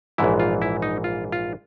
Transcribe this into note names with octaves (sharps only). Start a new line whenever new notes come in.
A#1 G#2 E3 E4
F4
E4
D#4
F4
F4